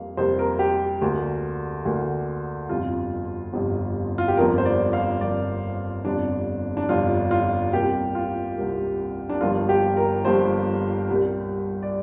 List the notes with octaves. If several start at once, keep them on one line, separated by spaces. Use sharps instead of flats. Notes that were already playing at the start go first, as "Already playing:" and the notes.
Already playing: F2 G3 A#3 F5
F2 C3 G3 A#3 C5
A#4
G4
D2 D3 A#3
D2 D3 A#3
G1 F2 C3 F4
G1 F2 C3
F4
G4
G1 F2 F3 A#3 A#4
C5
D5
F5
G1 F2 F3 A#3 D5
G1 F2 C3 D4
D4
G1 F2 C3 F4
F4
C2 C3 G3 A#3 G4
F4
C2 C3 G3 A#3
D4
G1 G2 F3 A#3 F4
G4
A#4
G1 G2 F3 A#3 C5
C2 A#2 G3 A#3
D5